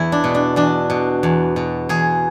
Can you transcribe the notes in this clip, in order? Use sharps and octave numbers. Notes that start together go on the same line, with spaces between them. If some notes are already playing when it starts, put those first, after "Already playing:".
Already playing: E2 E4
D4
B2
D4
E2 D4
B2
E2
B2
E2 G#4